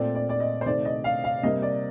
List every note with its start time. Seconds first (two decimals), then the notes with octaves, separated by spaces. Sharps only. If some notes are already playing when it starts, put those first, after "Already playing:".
Already playing: A#2 A3 C4 D5
0.15 D5
0.29 D5
0.40 D#5
0.61 C5
0.66 C3 D#3 A3 D5
0.85 D#5
1.04 F5
1.24 F5
1.43 C3 G3 A#3 D#5
1.62 D5